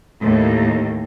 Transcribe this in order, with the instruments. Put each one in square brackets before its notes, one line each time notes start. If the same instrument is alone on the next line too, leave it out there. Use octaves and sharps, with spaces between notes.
[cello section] D#2 A2